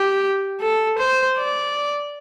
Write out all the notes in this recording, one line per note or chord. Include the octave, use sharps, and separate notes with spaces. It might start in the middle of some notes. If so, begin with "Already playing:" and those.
Already playing: G4
A4
C5
D5